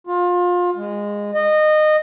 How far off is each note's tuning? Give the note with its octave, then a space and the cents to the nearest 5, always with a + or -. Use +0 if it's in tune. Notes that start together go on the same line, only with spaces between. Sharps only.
F4 +25
G#3 -15
D#5 -20